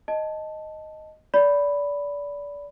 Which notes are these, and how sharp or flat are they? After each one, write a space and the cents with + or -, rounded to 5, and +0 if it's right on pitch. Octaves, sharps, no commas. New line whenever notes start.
D#5 +0 A5 +0
D5 -25 B5 +0